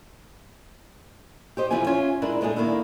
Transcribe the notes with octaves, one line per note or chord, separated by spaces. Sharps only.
G4 C5 D#5
F2 C3 E3 F3 E4 G#5
C#4 F4 E5 G#5
G#3 D4 E4 A#4 B4
A2 G#3 A3 B3 G#4
D#3 A#3 B3 D4 E4